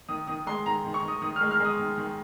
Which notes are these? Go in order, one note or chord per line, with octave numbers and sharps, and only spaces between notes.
D#3 D#6
D#3 D#6
G#3 C6
D#3 A#5
D#3
C#6
D#3
D#6
D#3 D#6
F6
G#3
F6
G#3 D#6
D#3
D#3